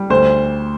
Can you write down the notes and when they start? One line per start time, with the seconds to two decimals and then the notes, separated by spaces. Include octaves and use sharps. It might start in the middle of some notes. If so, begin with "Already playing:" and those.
Already playing: G3
0.10 D2 C5